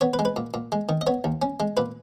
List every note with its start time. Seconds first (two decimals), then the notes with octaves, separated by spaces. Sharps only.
0.01 B3 C#5
0.14 B4
0.19 G#3
0.25 B4
0.36 A#2
0.54 A#2
0.72 G#3
0.89 D#3
1.01 D#5
1.07 B3 C#5
1.24 D#2
1.42 C#4
1.60 G#3
1.77 A#2 B4